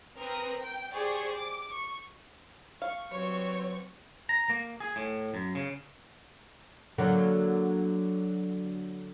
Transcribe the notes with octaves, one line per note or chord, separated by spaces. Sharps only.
C4 A#4 B4 D#6
G5
G4 G#4 C5 D5 C#6
D6
C#6
F5 C#6
F#3 G3 C4 B4 C#5
A#5
A#3
G#4
A2
F#2
C#3
D3 F#3 A#3